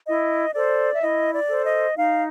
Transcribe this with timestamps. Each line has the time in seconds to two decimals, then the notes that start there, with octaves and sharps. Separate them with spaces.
0.07 E4 D#5
0.54 A4 C5 D5
0.93 E5
1.02 E4 D#5
1.33 D5
1.49 A4 C5
1.65 D#5
1.96 D#4 F5